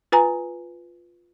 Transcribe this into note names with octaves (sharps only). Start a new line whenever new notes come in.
F4 B4 G#5 A#5